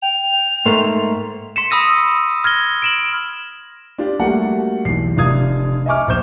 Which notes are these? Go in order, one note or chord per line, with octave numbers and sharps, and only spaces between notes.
G5 F7
G#2 A3 A#3 C6
C6 B6 C#7 E7
B5 D#6 E6 A#6 D#7
F6 G#6 A#6 G7
D7 E7 F#7
D4 F4 G4
G3 A3 A#3 F#4 F#5
B1 E2 C7
F1 D4 F4 F5 D#6 G#6
D#5 E5 G#5 C#6 D6 F6
A#1 C5 C#6 G6 E7